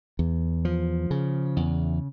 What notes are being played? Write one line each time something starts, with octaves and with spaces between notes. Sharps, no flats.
E2
F3
C#3
E2